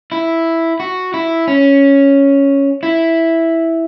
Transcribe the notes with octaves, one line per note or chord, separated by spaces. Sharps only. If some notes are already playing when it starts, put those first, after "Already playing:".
E4
F#4
E4
C#4
E4